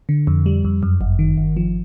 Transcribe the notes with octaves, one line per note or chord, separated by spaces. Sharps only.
D3
F2
G3
F2
F#2
G1
D#3
G1
F3